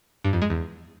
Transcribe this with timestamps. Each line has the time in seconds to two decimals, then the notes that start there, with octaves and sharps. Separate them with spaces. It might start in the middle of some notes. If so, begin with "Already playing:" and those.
0.24 G2
0.33 F2
0.42 G#3
0.50 E2